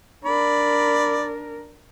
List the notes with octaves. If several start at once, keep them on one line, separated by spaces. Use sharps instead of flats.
D4 A#4 D5 B5